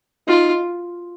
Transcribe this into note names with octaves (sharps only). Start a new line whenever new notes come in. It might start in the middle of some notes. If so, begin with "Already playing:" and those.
D#4 F4